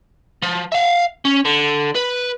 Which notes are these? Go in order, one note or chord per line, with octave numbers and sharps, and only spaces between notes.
F3
E5 F5
C#4
D3
B4